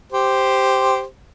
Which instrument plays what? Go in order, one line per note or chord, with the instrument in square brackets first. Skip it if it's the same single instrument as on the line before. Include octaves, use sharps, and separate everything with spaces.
[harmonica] G4 C5